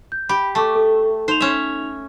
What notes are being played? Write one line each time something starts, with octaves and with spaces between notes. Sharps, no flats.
G6
G4 B5
A3 A5 C#6 D6
A4
D#4 C5 F7
C#4 E5